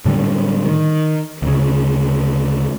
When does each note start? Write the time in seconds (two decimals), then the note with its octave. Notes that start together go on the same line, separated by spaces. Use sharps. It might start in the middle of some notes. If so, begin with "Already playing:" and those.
0.05 A2 D3 G3
0.65 D#3
1.42 D2 C#3